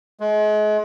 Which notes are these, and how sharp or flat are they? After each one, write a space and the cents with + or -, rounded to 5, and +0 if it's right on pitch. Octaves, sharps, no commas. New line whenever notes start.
G#3 +35